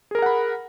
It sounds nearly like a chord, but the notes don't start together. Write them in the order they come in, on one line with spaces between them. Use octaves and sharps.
G#4 A#4 A#5 F#5 B5